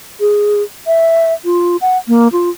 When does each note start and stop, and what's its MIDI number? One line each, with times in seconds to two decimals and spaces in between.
0.20 0.62 68
0.87 1.33 76
1.45 1.77 65
1.81 1.97 78
2.08 2.28 58
2.32 2.50 65